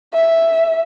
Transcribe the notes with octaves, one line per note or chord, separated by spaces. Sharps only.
E5